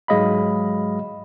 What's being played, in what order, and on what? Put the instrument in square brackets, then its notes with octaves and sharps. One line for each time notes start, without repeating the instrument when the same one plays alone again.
[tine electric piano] G#2 F#3 G#3 D#5 F5 B5